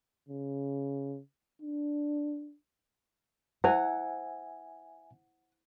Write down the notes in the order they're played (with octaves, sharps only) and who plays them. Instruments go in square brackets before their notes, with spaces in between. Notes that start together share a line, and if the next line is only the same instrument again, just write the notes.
[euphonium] C#3
D4
[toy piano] E4 C5 [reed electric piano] E5 G#5 [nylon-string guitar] F#5